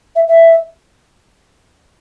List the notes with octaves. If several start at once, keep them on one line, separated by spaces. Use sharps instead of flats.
E5
E5